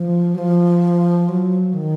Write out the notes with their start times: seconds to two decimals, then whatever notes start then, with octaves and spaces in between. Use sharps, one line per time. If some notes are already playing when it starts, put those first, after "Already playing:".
Already playing: F3
0.35 F#3
0.38 F3
1.29 F#3
1.73 D#3